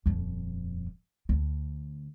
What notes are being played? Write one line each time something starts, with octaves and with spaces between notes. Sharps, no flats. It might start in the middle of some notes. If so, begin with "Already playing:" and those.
D#1 F2
D2